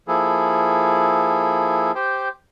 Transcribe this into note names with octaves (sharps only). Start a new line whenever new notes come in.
F3 A#3 E4 G#4 A4
G4 C5 G5